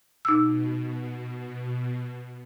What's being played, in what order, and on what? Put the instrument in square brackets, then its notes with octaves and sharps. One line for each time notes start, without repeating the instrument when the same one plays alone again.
[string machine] B2 [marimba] D#4 E6